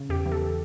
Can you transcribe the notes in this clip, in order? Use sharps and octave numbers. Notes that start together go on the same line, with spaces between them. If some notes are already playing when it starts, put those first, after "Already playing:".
Already playing: C#3
E2 G4
E3
A4